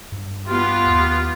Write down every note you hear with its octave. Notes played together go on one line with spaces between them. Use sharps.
G2
B3 F4 G4
D#2